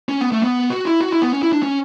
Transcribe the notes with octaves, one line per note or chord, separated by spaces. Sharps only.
C#4
B3
A3
B3
F#4
E4
F#4
E4
B3
C#4
E4
D4
C#4